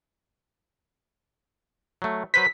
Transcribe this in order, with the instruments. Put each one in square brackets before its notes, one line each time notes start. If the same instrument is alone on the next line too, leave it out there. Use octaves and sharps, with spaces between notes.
[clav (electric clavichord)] F#3 A3
[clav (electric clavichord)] F#3 B4 C5 [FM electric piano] B6